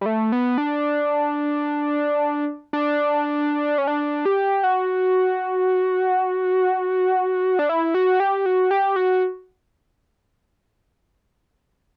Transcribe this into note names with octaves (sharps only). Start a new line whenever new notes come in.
G3
A3
B3
D4
D4
C#4
D4
G4
F#4
D4
E4
F#4
G4
F#4
G4
F#4